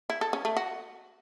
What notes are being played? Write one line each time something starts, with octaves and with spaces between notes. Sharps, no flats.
E4
A4
C#4
A3
F#4